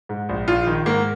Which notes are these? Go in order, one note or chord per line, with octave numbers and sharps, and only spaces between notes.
G#2
A#1
A#1 F4
D#3
G#2 A#3